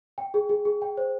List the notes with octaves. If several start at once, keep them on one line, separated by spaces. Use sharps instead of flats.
G5
G#4
G#4
G#4
G5
C5